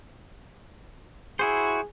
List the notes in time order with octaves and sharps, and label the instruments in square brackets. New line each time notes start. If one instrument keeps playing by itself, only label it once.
[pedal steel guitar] E4 F#4 C5 [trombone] G#4